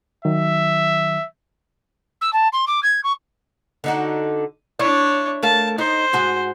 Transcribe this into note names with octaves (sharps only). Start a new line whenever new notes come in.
D#3 F#3 E5
E6
A5
C6
D6
G#6
C#6
D3 D#4 F#4
D4 E4 C#5 D5
A3 A#4 F5 A5
D#4 C5
G#2 F#4 G#4